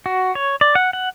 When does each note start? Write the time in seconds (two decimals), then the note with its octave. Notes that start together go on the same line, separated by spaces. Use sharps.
0.06 F#4
0.35 C#5
0.61 D5
0.75 F#5
0.93 F#5